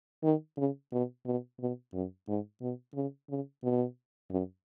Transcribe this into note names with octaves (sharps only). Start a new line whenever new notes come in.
D#3
C#3
B2
B2
B2
F#2
G#2
B2
C#3
C#3
B2
F#2